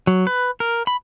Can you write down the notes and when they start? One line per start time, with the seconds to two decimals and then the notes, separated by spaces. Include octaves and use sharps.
0.07 F#3
0.27 B4
0.60 A#4
0.87 B5